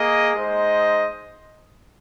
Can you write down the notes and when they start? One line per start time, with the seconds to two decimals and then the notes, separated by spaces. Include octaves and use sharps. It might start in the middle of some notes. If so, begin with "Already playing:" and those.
Already playing: A#3 G#4 D#5
0.35 G#3 D#4 C5 D#5